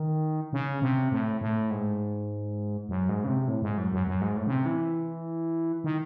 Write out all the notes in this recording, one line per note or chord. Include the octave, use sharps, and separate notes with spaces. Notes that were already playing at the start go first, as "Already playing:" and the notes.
Already playing: D#3
C#3
C3
A2
A2
G#2
F#2
G#2
C#3
C3
A2
G#2
F#2
F#2
F#2
G#2
A2
C#3
C3
E3
D#3